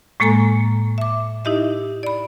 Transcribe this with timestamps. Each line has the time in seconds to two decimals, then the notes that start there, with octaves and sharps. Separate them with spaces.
0.20 A2 G#3 A#3 A4 G#5 A#5
0.98 E5 D6
1.45 D#4 E4 G4 D#5 E5
2.03 D5 B5